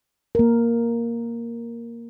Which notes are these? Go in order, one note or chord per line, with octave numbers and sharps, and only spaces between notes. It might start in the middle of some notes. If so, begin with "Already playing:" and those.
A#3 A#4